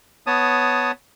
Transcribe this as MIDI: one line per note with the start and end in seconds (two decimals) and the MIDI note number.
0.27 0.91 59
0.27 0.91 73
0.27 0.91 81
0.27 0.91 87